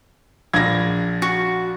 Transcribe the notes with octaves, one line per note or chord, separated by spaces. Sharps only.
A#1 G#6 A#6
F#4